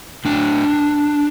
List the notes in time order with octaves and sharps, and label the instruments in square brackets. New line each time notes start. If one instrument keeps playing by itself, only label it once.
[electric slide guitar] A2 D4